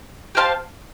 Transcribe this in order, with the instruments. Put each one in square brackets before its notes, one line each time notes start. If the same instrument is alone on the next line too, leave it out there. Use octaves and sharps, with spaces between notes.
[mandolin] G4 C5 F5 A5